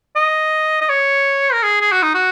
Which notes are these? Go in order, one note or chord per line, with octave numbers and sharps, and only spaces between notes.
D#5
D#5
C#5
A#4
G#4
G#4
F#4
D#4
F#4